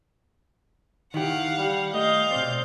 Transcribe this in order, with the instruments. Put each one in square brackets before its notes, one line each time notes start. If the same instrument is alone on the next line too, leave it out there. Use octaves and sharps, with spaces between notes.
[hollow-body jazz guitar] D#3 E4 G4 [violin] F5 F#5
[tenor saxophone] G3
[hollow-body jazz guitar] A3 [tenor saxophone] D#5 [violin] F5 G6
[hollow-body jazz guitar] B2 D5 [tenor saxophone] C4